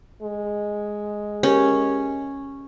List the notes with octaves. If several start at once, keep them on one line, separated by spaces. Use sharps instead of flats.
G#3
C#4 G4 A#4